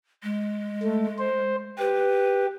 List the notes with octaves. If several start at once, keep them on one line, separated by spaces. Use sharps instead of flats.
G#3
A3
C5
G4 B4